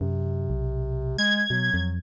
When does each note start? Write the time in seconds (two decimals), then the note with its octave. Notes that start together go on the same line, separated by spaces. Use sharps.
0.01 F#2 C3
0.50 B1
1.18 G#3 G#6
1.50 B2 F#3
1.74 F2